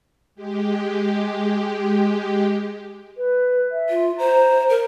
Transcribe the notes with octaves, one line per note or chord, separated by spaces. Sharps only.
G#3 G4
B4
E5
F4
C5 A#5
A#4